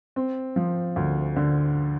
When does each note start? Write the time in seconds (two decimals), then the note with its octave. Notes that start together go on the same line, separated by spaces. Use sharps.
0.16 C4
0.56 F3
0.96 D2
1.36 D3